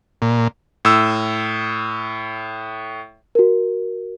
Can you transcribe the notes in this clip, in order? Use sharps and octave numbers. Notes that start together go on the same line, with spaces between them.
A#2
A2 E6
F#4 A#4